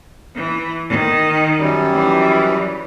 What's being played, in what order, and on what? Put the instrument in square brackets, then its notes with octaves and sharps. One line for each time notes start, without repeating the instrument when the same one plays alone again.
[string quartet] E3
D#3
[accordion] F#2 G3
[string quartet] E3